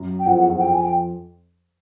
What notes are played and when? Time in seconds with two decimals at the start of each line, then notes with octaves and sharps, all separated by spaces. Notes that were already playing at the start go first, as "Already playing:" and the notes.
Already playing: F#2 F#3
0.20 G5
0.26 F2 F3 F#5
0.37 E2 E3 F#5
0.49 F2 F3
0.56 F#5
0.61 G5
0.73 G#5
0.84 G5